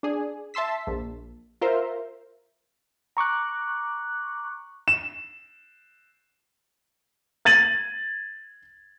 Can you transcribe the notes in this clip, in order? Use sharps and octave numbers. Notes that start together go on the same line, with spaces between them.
D4 G#4
E5 A5 C6 E6 B6
A#1
F4 A#4 C5 E5
A#5 C#6 D6 F#6
E7
G#6 A6 D#7 F#7